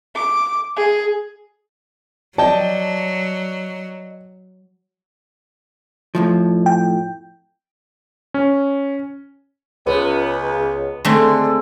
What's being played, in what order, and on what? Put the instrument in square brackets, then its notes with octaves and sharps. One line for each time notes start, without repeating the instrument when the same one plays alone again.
[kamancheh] D6
G#4
[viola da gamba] F#3 [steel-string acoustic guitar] D5 D#5 G5 [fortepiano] A5
[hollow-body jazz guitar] F2 A2 F3
[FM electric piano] G5
[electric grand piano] C#4
[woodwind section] C#2 [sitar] B3
[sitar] D3 [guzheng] G#3 A3 C4